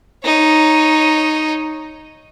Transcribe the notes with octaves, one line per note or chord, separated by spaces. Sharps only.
D#4 C#5